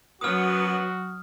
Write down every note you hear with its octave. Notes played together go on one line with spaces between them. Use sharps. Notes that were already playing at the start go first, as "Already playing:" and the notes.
F#2 F#3 B3 F#4 D#6 F6